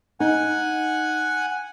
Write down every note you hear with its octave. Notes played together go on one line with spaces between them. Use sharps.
D#4 F#5 G#5